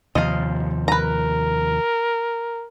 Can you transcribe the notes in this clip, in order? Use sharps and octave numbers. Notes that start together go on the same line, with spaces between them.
D#2 C3 F3 D#5 F5
A#4 B4 A#5